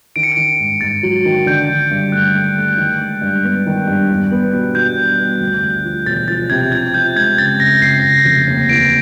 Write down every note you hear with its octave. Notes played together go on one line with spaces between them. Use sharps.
D#3 D7
C#7
D#3 D7
G#2
G#2 A6
F#3
D#3
D3 G6
D3
G2
A3 F#6
A3
A3
D#3
G#3
G2
B3
D#3
G2
E2
B3
B2
B2 G6
B3
B3
D2
D2
F3
E1 A6
F3 A6
C3 G#6
F3 G#6
F3 G6
G#3 G#6
C#3 A6
C#3 A#6
C#3 C7
C#3
F1
D#2
E3 D7